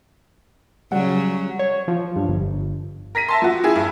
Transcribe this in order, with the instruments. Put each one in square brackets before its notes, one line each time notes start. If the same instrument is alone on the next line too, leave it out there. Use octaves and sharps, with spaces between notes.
[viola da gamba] C#3 F#3 [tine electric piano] G3 F#5
[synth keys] C#5
F3
G2
G1
[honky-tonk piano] A#4 A#6 B6 D#7
E5 A5 C6
F3 F#4
E4 G#4
G2